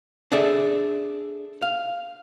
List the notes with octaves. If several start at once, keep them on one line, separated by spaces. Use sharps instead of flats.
D4 G#4 A4 D5 E5
F5